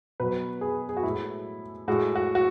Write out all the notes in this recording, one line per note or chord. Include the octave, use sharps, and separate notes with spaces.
B2 F#3 B4
G#4
G#4
F#4
A2 G#3 E4
A2 G#3 F#4
F#4
F#4